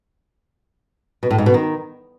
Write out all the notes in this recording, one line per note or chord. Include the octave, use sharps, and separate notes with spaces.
B2
A2
G#2
B2
D#3